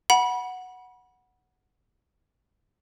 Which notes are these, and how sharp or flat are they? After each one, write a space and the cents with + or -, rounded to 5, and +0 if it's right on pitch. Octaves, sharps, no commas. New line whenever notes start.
F#5 +0 B5 -30